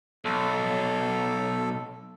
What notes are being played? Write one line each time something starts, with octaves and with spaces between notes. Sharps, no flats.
B1 A4